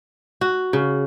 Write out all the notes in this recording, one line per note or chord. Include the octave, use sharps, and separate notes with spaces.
F#4
C#3